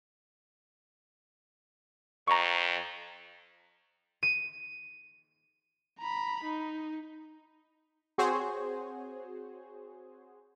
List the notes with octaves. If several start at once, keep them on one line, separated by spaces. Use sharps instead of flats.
F2 A#5 C#6
D#7
A#5 B5
D#4
C4 F#4 G#4 C5 C#5